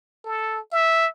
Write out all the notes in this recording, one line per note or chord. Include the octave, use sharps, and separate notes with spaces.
A4
E5